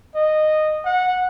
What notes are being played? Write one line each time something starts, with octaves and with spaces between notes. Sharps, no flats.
D#5
F#5